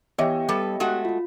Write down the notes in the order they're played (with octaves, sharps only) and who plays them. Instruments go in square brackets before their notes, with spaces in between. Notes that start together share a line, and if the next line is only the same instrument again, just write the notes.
[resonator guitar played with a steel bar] E3 [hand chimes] B3 G4 G5 [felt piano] C#5 D#5 E5
[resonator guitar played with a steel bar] G3 A4 B4
G#3 A3 F#4
[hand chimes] F4